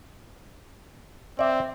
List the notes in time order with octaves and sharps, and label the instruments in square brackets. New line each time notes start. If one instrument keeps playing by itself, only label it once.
[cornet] C4 [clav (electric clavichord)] D5 E5